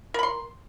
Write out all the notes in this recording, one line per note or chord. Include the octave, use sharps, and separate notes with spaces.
A#4 B5 C6